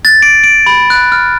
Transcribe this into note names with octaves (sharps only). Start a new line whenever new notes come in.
A6
D7
D7
B5
F#6
F6